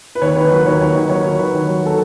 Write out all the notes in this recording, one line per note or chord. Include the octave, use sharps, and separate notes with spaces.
B4
D#2 C#5
D#3 B4
F#3 B4
D#2 C#5
D#2
D#3
F#3 C#5
D#2
D#2 B4
D#3
F#3
A4